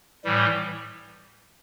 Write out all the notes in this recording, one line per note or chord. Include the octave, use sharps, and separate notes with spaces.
A2 E3 G3